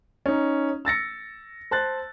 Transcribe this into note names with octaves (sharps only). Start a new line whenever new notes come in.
C#4 D#4
E6 A6 A#6 C#7
C5 A5 F#6 A6